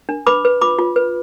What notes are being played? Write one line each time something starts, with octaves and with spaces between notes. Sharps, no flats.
D4
B4 B5 D6
B4
F4 B5 D6
F4
B4